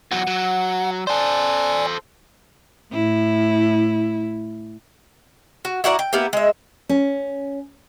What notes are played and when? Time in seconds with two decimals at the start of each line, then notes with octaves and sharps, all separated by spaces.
0.12 E2 F#3 F#5
0.27 F#3
1.07 A4 C5 D5 G#5
2.92 A2 E4
5.65 F#4
5.84 E4 F#4 A#4 D5
5.99 G5
6.13 A#3 B3 E4 G4
6.33 G#3 E5
6.89 C#4